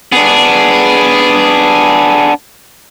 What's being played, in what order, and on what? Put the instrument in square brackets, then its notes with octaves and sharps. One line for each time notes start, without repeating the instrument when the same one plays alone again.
[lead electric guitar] B3 D4 [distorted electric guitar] G#4